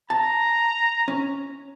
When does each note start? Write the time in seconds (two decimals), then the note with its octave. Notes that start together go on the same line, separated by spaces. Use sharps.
0.10 A5 A#5
1.08 C#4